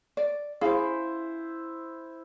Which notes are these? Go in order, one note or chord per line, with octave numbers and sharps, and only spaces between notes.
D5
E4 G#4 C5 F5